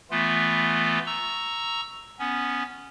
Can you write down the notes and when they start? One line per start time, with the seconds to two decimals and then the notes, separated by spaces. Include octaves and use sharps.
0.11 E3 A3 B3 F4
1.07 A#5 C#6 E6
2.19 B3 C#4